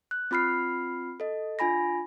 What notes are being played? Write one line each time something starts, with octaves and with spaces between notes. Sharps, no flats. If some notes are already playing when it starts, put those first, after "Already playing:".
F#6
C4 F4 B5 F6 C7
A4 D#5
D4 F4 G#5 B5 A#6